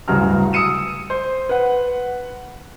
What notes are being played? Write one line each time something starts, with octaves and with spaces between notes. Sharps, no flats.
D1 G2 C#3 F#4 A#5 F6
D#6 E6 C#7 D#7 E7
C5
B4 F#5